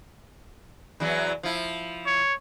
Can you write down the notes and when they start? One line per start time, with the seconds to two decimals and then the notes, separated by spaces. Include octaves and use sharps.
1.00 E2 E3 F#3
1.43 F3 E4
2.06 C#5